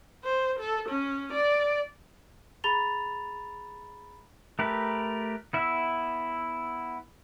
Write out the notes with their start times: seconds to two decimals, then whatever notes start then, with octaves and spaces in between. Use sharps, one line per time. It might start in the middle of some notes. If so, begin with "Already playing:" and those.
0.24 C5
0.60 A4
0.89 C#4
1.33 D5
2.64 G#4 A#5 B5 A6 F7 G7
4.59 A3 G4 A#4 B4
5.53 B3 E4 E5